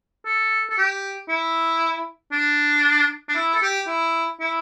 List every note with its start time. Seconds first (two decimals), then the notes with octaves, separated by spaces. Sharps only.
0.25 A4
0.69 A4
0.78 G4
1.29 E4
2.32 D4
3.29 D4
3.35 E4
3.54 A4
3.62 G4
3.87 E4
4.40 E4